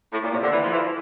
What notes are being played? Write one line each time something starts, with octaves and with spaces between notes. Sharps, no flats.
A2
A#2
C3
D3
E3
F3
E3